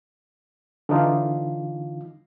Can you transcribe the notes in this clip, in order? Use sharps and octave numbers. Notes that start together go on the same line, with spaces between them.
D3 E3 D#4 F4